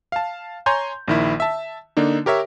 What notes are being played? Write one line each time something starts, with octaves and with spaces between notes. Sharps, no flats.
F5 A5
C#5 G#5 A#5 C6 G6
A#1 D#3 E4
E5 A5
D3 A#3 D4 D#4
G4 A#4 C#5 E5